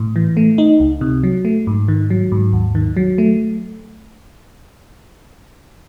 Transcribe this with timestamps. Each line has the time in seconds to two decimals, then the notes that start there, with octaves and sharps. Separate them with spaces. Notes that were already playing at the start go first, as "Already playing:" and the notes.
Already playing: A2
0.16 E3
0.37 A3
0.58 D#4
0.80 C#2
1.01 C3
1.23 F#3
1.45 A3
1.67 G#2
1.88 D#3
2.10 F#3
2.32 G#2
2.53 D#2
2.75 D#3
2.97 F#3
3.18 A3